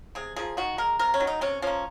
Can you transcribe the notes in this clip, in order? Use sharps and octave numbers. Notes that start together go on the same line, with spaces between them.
C3 G#4
F3 A#3 G#4
D#3 F#4
G#3 A#4
C3 A#4
C#4
D#3 F#3
D#4
C3 C#4
F3 A#3 C#4